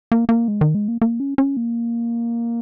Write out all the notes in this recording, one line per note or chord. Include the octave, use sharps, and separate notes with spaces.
A#3
A#3
G#3
D#3
G#3
A#3
A#3
C#4
C#4
A#3